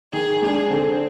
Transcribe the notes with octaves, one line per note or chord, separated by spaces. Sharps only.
D#3 G#4
G#3 D4 G#4
D3 C4